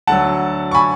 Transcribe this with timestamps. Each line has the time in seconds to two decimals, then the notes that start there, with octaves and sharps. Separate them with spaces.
0.07 D2 D3 F#3 F#5 A5
0.71 C#6
0.74 G#5 B5